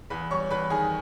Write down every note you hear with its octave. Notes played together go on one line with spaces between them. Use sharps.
E2 B4 B5
G3 C#5 C#6
E2 B4 B5
D#3 G#4 G#5